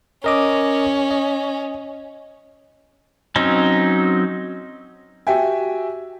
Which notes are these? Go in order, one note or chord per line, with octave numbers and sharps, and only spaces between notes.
C#4 A#4 D#5 D6
D#5
F#3 C4 C#4 D#4
F#4 G4 E5 G5 G#5